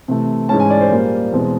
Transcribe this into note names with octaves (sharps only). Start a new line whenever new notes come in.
C3 E3 A3
G#2 E3 G#3 C#4 A5
G#5
D5
C5
A#2 G3 A#3
E2 B2 G#3 C4